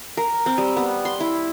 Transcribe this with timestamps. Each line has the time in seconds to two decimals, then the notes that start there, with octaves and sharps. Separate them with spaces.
0.17 A#4
0.46 C4
0.58 G3
0.77 B3
1.05 C6
1.20 E4